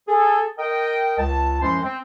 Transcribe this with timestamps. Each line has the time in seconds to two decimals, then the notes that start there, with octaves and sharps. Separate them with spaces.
0.07 G#4 A4
0.58 A#4 D#5 G5
1.18 C#2 A5
1.61 F#2 F3 G#3 E4 C5 C6
1.82 C4